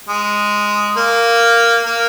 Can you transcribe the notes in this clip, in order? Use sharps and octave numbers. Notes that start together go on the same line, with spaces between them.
G#3
A#3
A#3